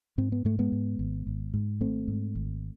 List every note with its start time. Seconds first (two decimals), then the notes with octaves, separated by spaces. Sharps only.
0.18 G#2 C4
0.32 B3
0.45 G#2 A3
0.59 G#3 B3
0.72 G#2
0.99 G#1
1.27 G#1
1.54 G#2
1.80 G#1 A3 C4
2.08 G#2
2.35 G#1